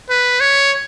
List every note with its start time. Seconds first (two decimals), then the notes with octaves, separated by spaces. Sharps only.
0.09 B4
0.40 C#5